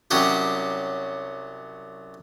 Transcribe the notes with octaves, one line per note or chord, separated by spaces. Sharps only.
C2 F#3 C#4 F#4 G4